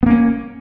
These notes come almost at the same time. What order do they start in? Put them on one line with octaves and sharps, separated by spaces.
B3 A#3 C#4